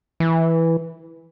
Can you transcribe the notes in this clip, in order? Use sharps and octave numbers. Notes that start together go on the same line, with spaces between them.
E3